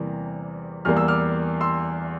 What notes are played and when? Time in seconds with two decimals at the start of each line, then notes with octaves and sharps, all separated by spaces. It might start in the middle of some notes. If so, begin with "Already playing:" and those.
Already playing: E2 C3 E3 G3 A#3
0.85 E2 E3 G3 A#3 F6
0.97 E6
1.08 D6 F6
1.61 C6 E6